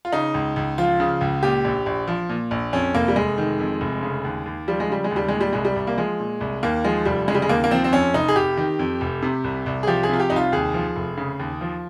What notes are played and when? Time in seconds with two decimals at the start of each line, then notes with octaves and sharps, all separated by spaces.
0.05 F4
0.13 C#3 D#4
0.34 C#2
0.56 C#2
0.78 F3 F4
1.00 C#3
1.21 C#2
1.43 A#2 G4
1.64 A#1
1.86 A#1
2.08 F3
2.29 A#2
2.51 A#1
2.73 F2 C#4
2.95 F1 A#3
3.08 G3
3.16 F1 G#3
3.38 D#3
3.60 F2
3.81 F1
4.03 C#3
4.24 D#2
4.46 D#2
4.68 F3 G3
4.80 G#3
4.89 C#3 G3
5.04 G#3
5.11 D#2
5.16 G3
5.28 A#2 G#3
5.41 G3
5.53 C2 G#3
5.65 G3
5.76 C2
5.87 A#3
5.98 F3 G#3
6.20 A#2
6.41 C2
6.63 D#2 A#3
6.84 F3 G#3
7.05 F1 G3
7.28 C#3 G#3
7.35 G3
7.42 G#3
7.49 D#2 A#3
7.64 A#3
7.71 F3 C4
7.84 C4
7.93 F2 C#4
8.14 F1 D#4
8.28 G#4
8.36 F1 G4
8.57 D#3
8.79 F2
9.01 F1
9.22 C3
9.44 C2
9.66 C2
9.83 G#4
9.87 F3 G4
10.03 G#4
10.09 C3 F4
10.20 G4
10.30 C2 D#4
10.36 F4
10.52 D#2 G#4
10.74 F3
10.96 F1
11.17 C#3
11.39 D#2
11.61 F3